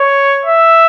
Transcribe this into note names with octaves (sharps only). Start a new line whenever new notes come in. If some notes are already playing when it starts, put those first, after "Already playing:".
Already playing: C#5
E5